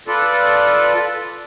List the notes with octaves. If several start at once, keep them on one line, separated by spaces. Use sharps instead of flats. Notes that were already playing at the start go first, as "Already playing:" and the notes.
F4 A4 B4 D5